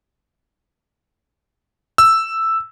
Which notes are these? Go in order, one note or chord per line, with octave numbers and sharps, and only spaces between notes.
E6